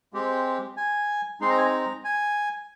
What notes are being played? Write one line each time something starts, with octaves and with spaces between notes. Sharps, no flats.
G#3 C4 G4
G#5
G#3 C4 D#4 C6
A#5
G#5
A#5
G#5